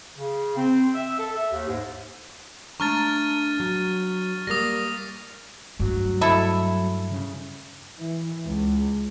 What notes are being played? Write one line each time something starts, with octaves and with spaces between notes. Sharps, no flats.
C#3
C4
E5
A4
E5
D#2
G#2
A3 D4 A#5 C#6 F6 A6
F#3
G3 A#3 D#6 A#6
G2 F#3 A3
E4 A4 E5
C#3
E3
C#2